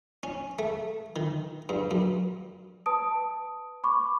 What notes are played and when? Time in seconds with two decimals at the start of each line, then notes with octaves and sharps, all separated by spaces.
0.23 C#4
0.59 A3
1.16 D#3
1.69 G2
1.91 F#2
2.86 B4 A5 D#6 D7
3.84 B5 C#6 D6